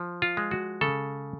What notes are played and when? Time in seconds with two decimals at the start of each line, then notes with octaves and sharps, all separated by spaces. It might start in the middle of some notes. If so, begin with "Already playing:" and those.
Already playing: F3
0.22 F4
0.37 G#3
0.51 F#4
0.81 C#3 A4